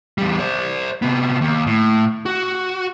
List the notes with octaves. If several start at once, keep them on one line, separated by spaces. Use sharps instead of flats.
E2 G3
C5 D5
C3 B3
D#2
A2
F#4